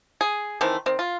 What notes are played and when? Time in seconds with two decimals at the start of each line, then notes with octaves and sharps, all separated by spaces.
0.21 G#4
0.61 D#3 E3 A3 C4
0.86 D#3 C4
0.99 F4